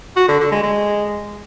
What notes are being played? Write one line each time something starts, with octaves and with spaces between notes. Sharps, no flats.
F#4
D3
D3
G#3
G#3